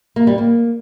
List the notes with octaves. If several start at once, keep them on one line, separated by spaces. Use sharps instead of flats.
A#3
G3
A#3